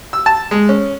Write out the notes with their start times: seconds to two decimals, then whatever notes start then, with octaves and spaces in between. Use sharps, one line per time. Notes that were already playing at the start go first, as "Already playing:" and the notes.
0.13 E6
0.26 A5
0.51 G#3
0.69 C#4